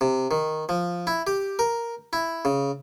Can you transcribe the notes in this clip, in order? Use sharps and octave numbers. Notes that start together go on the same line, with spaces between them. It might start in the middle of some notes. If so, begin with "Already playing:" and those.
C3
D#3
F3
E4
G4
A#4
E4
C#3